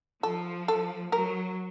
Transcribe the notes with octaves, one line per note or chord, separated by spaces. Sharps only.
F3 A4
A4
F#3 A#4